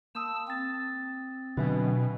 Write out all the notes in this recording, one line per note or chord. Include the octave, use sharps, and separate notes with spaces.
A#3 A5 D#6 E6
C4 D#6 A6
B2 D3 F#3 B4 E5 G#5